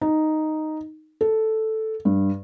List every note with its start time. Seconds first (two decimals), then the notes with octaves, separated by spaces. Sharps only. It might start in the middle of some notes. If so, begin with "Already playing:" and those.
0.01 D#4
1.21 A4
2.05 G2